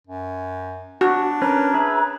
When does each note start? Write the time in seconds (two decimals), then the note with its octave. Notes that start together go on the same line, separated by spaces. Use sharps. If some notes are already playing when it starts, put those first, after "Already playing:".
0.07 F#2
1.01 D4 F#4
1.42 C#4 A#4 B4 A#5
1.74 G#4 B4 E5